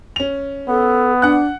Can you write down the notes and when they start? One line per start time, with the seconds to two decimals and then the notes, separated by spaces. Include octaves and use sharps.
0.16 C#4 F7
0.69 B3 A4
1.22 D4 F#5 F#6